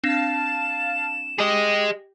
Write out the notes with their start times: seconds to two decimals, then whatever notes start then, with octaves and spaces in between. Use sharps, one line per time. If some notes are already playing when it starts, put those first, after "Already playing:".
0.04 C4 D4 F5 A5 E7
1.39 G4 G#4 D#5